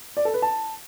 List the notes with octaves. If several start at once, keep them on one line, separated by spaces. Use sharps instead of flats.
D5
A4
B4
A5